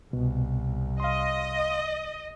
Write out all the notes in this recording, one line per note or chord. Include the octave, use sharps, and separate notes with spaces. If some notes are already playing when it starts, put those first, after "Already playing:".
C2 B2
D#5 F5 C6